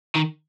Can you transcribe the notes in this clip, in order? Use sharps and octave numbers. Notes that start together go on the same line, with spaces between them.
D#3